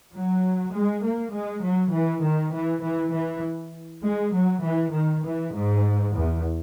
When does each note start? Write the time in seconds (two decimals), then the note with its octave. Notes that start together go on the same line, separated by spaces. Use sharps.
0.13 F#3
0.74 G#3
1.03 A#3
1.34 G#3
1.63 F#3
1.93 E3
2.23 D#3
2.53 E3
2.83 E3
3.13 E3
4.03 G#3
4.34 F#3
4.63 E3
4.92 D#3
5.24 E3
5.53 G#2
6.13 E2